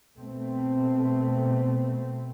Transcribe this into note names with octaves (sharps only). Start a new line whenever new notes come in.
B2 A3 C4